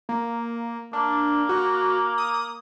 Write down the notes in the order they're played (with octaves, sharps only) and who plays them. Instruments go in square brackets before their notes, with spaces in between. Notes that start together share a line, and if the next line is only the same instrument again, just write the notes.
[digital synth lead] A#3
[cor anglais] A#3 [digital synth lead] D4
[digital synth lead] F#4
D#6